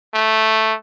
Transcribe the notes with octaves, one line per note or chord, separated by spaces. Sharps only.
A3